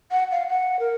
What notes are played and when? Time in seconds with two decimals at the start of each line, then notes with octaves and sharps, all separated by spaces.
0.11 F#5
0.31 F5
0.49 F#5
0.80 A#4